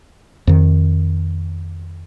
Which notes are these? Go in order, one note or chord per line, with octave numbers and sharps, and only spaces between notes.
F2 D#3